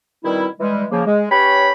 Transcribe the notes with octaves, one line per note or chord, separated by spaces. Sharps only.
B2 D#3 G3 C4 E4
E3 G3 G#3
C#3 F3 A#3
G#3
C#4 G4 B4 C#5 G5 B5